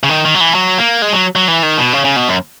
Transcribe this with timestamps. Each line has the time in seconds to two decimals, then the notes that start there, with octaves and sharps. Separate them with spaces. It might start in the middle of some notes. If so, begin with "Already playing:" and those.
0.03 C#3
0.09 D#3
0.25 D#3
0.35 F#3
0.40 E3
0.55 F#3
0.78 A#3
1.02 G#3
1.13 F#3
1.36 F#3
1.48 E3
1.63 D#3
1.78 B2
1.93 C#3
2.05 C#3
2.16 B2
2.28 F#2